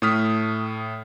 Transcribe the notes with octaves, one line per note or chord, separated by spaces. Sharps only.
A2 A3 D#6 F6 B6